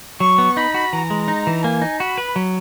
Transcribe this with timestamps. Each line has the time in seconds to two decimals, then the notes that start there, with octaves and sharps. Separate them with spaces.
0.20 F#3 C#6
0.38 B3
0.57 D#4 B5
0.74 F#4
0.93 E3 A#5
1.10 G#3
1.28 D#4
1.47 E3
1.64 A#3 G#5
1.82 D#4
2.00 F#4 B5
2.18 B4
2.36 F#3